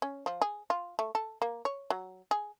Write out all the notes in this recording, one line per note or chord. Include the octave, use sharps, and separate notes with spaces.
C#4
F3
G#4
F4
A3
A4
A#3
C#5
F#3
G#4